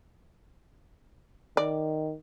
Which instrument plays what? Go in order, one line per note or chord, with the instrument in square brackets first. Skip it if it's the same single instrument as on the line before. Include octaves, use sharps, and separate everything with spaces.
[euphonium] D#3 [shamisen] D5